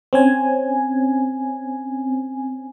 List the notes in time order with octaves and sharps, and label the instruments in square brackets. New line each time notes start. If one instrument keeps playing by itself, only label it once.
[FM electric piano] C4 C#4 G#5